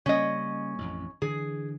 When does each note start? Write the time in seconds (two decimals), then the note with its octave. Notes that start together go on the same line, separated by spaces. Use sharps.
0.06 C#3 G3 A#3 C#4 D#5
0.78 A1 F2
1.22 D3 E3 G#4